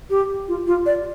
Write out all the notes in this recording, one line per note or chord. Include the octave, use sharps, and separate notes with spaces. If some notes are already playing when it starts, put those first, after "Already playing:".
G4
F4
F4
D5